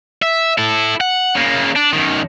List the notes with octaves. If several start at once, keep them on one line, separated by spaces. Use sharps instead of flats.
E5
E4 A4
F#5
C#3 A#3
D4
F#2 D#3